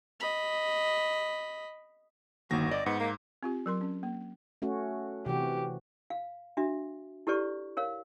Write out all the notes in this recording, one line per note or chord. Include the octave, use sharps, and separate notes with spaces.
D#5 B5
G1 D#2 D#3 A#3 F#4 A#6
D5 D#5
G#2 B3
A#3
C4 F4 G4
F#3 A#4 C6
C#4
A#3
A3 C#4 F#4
C3 E3 F#4 G4
F5
D4 F#4 E5
E4 G4 A4 B4 D5 C#6
A#4 C#5 F5